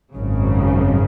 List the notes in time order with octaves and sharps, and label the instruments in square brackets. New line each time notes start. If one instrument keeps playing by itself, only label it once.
[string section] G#1 F#2 C#3